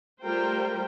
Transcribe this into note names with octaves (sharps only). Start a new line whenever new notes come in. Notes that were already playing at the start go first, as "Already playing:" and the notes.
G3 A3 F4 A#4 C5 G5